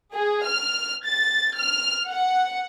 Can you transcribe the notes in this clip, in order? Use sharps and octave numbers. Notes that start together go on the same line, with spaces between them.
G#4
F6
A6
F6
F#5